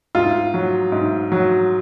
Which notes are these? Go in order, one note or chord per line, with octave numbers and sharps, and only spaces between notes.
G#2 F4
F#3
G#2
F#3